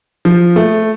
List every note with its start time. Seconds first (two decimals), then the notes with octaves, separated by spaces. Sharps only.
0.25 F3
0.56 A3